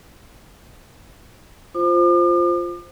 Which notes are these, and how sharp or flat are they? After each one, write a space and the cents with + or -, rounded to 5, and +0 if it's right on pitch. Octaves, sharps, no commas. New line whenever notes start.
F4 +0 C5 +0 D6 +45